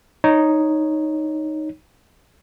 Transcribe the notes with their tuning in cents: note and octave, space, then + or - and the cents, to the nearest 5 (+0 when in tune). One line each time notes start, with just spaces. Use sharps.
D#4 +0 C#5 +0